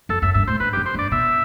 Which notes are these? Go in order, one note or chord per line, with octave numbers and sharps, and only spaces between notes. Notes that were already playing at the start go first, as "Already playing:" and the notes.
F#2 A4
F#2 E5
G2 E5
A2 C5
G2 B4
G4
F#2
C5
G2 D5
B2 E5